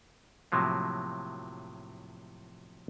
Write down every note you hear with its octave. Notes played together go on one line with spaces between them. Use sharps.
A2 C3 F3 F#3 A#3